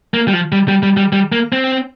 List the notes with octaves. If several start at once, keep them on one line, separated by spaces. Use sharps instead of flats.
A#3
G3
F3
G3
G3
G3
G3
G3
A#3
C4